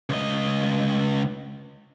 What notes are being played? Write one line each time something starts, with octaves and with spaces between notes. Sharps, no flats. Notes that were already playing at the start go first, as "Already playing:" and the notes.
C#2 D#5